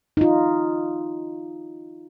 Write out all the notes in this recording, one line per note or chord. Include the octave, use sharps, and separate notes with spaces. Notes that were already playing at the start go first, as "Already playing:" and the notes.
D#4 F4